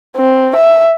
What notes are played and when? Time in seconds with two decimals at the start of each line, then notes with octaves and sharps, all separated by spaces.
0.17 C4
0.56 E5